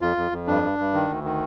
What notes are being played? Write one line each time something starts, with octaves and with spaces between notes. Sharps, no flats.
F2 F4
F2
F2
G2 D4
G2
G2
D#3
D2
D#3